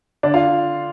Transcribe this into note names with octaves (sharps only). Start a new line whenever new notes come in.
D3 D4 D5
F4 F5